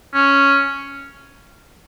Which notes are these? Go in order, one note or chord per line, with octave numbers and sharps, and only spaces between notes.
C#4